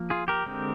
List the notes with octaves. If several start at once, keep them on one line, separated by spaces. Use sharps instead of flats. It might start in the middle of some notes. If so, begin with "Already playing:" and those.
Already playing: F3 A#3
F4 G#4
G4 A#4
D3 G#3 C4